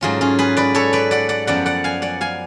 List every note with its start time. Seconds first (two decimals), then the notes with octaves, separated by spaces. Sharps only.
0.01 G#2 F#3 A3 C#4 F4 G#4
0.21 C#4 F4
0.39 G#4 B4
0.57 B4 D5
0.75 A4 C#5
0.93 B4 D5
1.11 D5 F#5
1.29 D5 F#5
1.47 F#2 F3 B3 D5 F#5
1.66 D5 F#5
1.84 F5 G#5
2.02 D5 F#5
2.21 F5 G#5